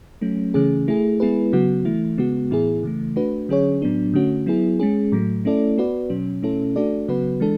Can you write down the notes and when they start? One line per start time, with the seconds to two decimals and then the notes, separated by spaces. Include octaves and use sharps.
0.21 F#3 A3 C#4
0.54 C#3 E3 A3 C#4 G#4
0.88 A3 E4 G#4
1.20 G#3 B3 E4 G#4 B4
1.53 C#3 F#3 B3 F#4
1.85 E3 A3 E4
2.18 C#3 G#3 B3 F#4
2.51 A2 E3 B3 E4 G#4
2.83 C#3 E3 A3
3.16 A3 D4 F#4 B4
3.49 D3 F#3 C#4 G#4 C#5
3.82 A2 F#3 B3 D4
4.14 D3 A3 C#4 F#4
4.46 F#3 B3 E4 G#4
4.79 G#3 C#4 G#4
5.12 A2 F#3 A3
5.45 A3 C#4 E4 A4 D5
5.78 B3 F#4 B4 D5
6.10 B2 F#3 C#4
6.42 B2 A3 C#4 E4 A4
6.76 A3 D4 F#4 A4 D5
7.08 C#3 F#3 B3 F#4 B4
7.40 E3 G#3 D4 A4